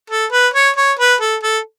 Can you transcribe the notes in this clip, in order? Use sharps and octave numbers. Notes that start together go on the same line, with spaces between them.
A4
B4
C#5
C#5
B4
A4
A4